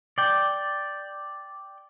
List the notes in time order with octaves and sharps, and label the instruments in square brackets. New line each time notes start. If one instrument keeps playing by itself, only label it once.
[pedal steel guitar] D5 G5